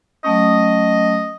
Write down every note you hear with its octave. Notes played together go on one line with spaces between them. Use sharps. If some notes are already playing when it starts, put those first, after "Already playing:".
F#3 A3 C#4 D#5